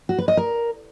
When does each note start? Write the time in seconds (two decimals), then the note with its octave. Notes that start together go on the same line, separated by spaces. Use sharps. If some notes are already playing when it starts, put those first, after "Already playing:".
0.09 F#4
0.18 B4
0.28 D#5
0.37 A#4